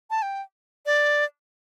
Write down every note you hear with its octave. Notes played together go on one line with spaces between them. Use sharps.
A5
G5
D5